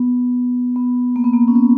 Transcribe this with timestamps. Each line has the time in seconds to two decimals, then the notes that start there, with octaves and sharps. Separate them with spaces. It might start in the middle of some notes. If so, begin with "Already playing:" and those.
Already playing: B3
0.76 B3
1.16 A#3
1.24 B3
1.34 A#3
1.48 C#4
1.55 B3